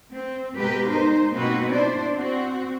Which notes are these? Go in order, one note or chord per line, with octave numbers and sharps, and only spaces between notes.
C4
B2 G#3 G4 A#4 B4
G#3 D#4 C5
B2 A#3 C4 D#4 F#4 B4
D4 E4 C5 D5
C4 F#4